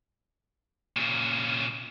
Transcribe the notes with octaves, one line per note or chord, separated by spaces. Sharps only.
A#2 C#3